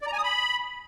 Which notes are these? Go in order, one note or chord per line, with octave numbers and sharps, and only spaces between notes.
D5
A#5
G#5
D#6
B5